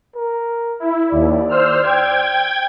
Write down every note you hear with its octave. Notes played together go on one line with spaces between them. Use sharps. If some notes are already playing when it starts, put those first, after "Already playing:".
A#4
E4
D#2 D5
C5 E6 F6
G5 G#6